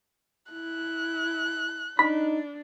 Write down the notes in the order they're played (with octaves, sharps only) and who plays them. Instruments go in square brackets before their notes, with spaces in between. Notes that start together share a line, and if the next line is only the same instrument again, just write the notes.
[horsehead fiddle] E4 [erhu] F#6
[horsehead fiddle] D4 [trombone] D#4 [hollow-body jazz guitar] B5